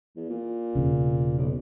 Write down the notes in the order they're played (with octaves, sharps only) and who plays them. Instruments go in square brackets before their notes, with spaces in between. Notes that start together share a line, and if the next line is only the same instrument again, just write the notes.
[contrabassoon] E2
A#2
[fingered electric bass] E1 C#3
[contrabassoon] B1